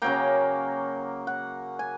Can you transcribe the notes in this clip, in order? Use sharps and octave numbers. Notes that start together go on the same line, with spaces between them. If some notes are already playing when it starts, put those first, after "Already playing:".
C#3 F#3 A#3 G5
F#5
G#5